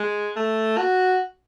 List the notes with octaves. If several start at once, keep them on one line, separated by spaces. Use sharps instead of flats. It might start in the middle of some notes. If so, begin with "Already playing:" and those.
Already playing: G#3
A3
F#4